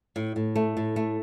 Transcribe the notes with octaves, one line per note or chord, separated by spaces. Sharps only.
A2
A2
A3
A2
A3